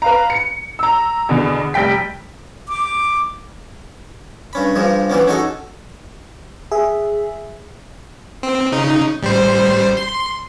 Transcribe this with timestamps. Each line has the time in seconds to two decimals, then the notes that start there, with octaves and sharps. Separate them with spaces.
0.02 B4 F5 A#5
0.30 C#7
0.79 A#5 E6
1.29 E2 B2 D3
1.74 F1 G3 G5 B6
2.69 D6
4.53 G2 C#4 B5
4.75 G2 F3 G3 G#3
5.10 E3 G3 B3 C#4
5.27 C#4 D#4 F#4 G#4 A4
6.72 G#4 E5
8.43 C4
8.72 C#3 D#4
9.21 A1 G3 C5
9.97 C6